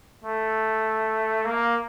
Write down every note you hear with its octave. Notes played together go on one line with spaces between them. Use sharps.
A3
A#3